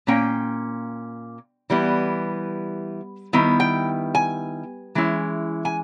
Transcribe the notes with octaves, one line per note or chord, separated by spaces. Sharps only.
A#2 A#3 C#4 G5
E3 G3 B3 E4
D#3 G3 B3 E4
G5
G#5
E3 G#3 C#4 E4
G#5